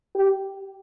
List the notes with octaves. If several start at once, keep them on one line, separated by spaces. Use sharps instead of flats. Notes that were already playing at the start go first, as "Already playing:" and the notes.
G4